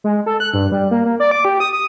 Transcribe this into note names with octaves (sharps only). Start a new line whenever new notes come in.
G#3
A4
F#6
G2
G3
A#3
A#3
D5
D6
G4
D#6
D#6